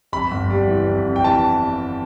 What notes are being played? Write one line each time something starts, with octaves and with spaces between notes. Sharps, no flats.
F2 B5
G1
G3
E3
F2
F2
G5
E3 A5